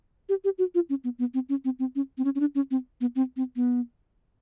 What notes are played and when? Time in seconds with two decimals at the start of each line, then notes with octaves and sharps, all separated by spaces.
0.29 G4
0.44 G4
0.58 F#4
0.75 F4
0.89 C#4
1.04 B3
1.19 B3
1.34 C4
1.49 C#4
1.65 C4
1.79 C4
1.96 C#4
2.18 C4
2.25 C#4
2.35 C#4
2.40 D4
2.55 C#4
2.71 C4
3.01 B3
3.16 C4
3.37 C4
3.56 B3